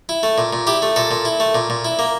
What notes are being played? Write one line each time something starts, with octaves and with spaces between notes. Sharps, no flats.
E4
A3
A#2
A#2
E4 G4
A3
A#2 A4
A#2
E4
A3
A#2
A#2
E4
A#3